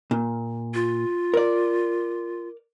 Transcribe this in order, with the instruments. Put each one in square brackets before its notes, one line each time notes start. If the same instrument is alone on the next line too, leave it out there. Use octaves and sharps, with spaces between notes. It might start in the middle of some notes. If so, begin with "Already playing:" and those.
[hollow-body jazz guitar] A#2
[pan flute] F4
[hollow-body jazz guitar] A#4 D5